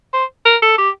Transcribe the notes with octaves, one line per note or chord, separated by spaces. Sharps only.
C5
A#4
A4
G4